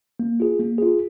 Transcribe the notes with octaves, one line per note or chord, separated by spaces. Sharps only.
A#3
F4 G#4
A#3
F4 G#4